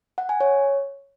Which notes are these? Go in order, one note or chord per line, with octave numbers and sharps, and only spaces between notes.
F#5
G#5
C#5